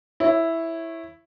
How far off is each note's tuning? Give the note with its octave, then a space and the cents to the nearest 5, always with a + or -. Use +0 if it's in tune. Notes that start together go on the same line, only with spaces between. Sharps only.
E4 +0 C#5 -20